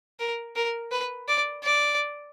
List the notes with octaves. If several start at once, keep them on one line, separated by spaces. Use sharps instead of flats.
A#4
A#4
B4
D5
D5